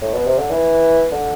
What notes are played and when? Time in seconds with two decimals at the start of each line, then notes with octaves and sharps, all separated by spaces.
0.02 A2
0.14 B2
0.26 C3
0.38 D3
0.50 E3
1.12 D3